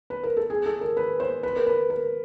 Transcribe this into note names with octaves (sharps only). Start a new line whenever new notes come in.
B4
A#4
A4
G#4
A4
A#4
B4
C5
B4
A#4
B4
A#4